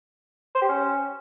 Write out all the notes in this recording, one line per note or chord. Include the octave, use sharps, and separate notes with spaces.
C5
G4
C#4